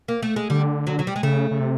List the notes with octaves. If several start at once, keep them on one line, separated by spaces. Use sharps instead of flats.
A#3
A3
G#3
D3 G3
F#3
F#3
G3
G#3
C#3 A3
C#3
C3